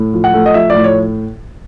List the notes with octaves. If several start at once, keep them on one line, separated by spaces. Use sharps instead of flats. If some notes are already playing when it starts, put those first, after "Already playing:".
Already playing: A2
F3
F#5
A3
D#5
F3 E5
A2 D5
C#5